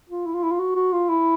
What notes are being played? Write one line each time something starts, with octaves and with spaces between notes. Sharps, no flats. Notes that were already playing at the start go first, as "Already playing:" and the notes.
F4
E4
F4
E4
F4
F#4
F#4
F4
E4